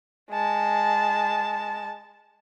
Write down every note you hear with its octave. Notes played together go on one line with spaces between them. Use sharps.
G#3 A5